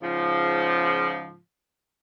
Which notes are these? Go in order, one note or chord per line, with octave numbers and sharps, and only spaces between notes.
G#2 C#3 F3